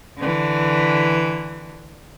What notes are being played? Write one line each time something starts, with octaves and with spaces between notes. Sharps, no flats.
D3 E3